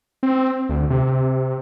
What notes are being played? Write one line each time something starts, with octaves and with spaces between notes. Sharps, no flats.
C4
D2
C3